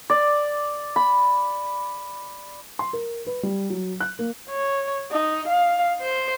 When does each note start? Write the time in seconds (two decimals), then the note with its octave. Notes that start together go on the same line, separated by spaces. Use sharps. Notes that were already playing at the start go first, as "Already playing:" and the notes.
0.10 D5
0.96 B5
2.79 C6
2.93 A#4
3.27 B4
3.43 G3
3.70 F#3
4.00 F#6
4.19 A#3
4.50 C#5
5.11 D#4
5.48 F5
6.01 C5